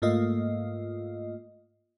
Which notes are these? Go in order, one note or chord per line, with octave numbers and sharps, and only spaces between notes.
G#2 A3 A#3 F4 D#5